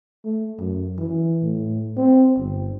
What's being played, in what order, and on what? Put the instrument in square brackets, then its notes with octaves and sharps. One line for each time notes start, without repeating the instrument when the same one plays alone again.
[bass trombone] A3
F#2
E3
A2
C4
G1